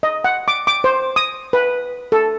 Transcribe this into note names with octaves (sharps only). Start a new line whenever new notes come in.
D#5
F#5
D6
D6
C5
D#6
B4
A4